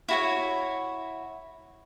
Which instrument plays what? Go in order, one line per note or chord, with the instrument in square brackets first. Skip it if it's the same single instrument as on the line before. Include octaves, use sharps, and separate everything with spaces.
[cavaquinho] E4 F#4 C#5